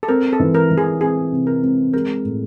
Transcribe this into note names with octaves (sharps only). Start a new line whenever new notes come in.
A4
C4 A#4
A4
E3
A#4
E3
G#4
C4 G#4
C3
A#4
C4
G#3 A#4
A2